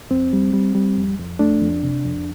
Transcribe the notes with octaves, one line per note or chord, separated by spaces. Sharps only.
F2 C4
G3
G3
G3
F2
F2
A3 D4
F2
C3
F2